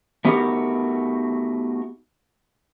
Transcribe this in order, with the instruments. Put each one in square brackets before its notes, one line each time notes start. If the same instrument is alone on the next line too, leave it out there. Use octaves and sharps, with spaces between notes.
[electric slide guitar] A3 B3 D#4 F#4 G4 A#4